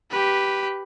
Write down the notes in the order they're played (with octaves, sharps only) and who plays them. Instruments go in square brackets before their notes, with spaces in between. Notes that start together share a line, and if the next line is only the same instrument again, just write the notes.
[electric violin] G4 B4